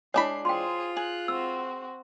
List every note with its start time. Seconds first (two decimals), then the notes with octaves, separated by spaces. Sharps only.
0.14 G#3 D4 E4 C#5 B5 C7
0.45 F4 G#4 C5 G5 C6
0.97 G#4 F#6
1.28 C4 F#4 E6